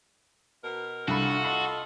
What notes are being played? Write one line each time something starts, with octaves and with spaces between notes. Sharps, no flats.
B2 A#4
C2 D4 F4 F#4 A4 B5
D#5 B5 C6 F#7